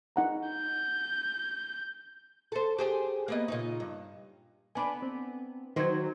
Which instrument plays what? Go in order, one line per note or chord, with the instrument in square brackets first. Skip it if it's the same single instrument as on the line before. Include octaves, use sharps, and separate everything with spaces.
[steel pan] D#4 F#5 A#5
[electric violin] G6
[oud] A4 C5
G4 G#4 C5
A#3 B3 D#5
A#2 C#3 D#4
G2
[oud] B3 D4 [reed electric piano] G#5 B5
[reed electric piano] C4
[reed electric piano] D#3 D#4 G#6 [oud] F#3 C5